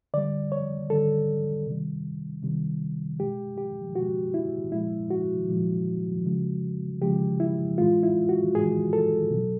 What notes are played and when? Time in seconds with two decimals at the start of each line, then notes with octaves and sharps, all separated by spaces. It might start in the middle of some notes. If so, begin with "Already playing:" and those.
0.14 D3 G3 D5
0.52 C#5
0.90 D3 G3 A4
1.66 C3 D#3 G3
2.43 C3 D#3 G3
3.19 B2 G#3 G4
3.58 G4
3.96 B2 F#4
4.01 G#3
4.34 E4
4.72 A#2 F3 G#3 E4
5.11 F#4
5.49 A#2 F3 G#3
6.25 C#3 F3 G#3
7.01 C#3 F3 G#3 G4
7.40 E4
7.78 A2 E3 G#3 F4
8.03 E4
8.29 F#4
8.55 A2 E3 G#3 G#4
8.93 A4
9.31 B2 F#3